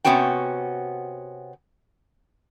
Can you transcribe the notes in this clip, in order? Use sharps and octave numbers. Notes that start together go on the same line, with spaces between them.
C3 F3 B3 C#4 F#4 G5